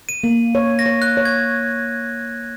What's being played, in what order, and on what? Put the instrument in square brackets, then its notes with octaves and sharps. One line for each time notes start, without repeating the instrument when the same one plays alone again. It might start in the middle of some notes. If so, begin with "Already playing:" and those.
[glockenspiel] D#7
[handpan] A#3
C#5
[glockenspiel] A#6
[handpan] C#5
[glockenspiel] F#6
[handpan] C#5
[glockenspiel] G#6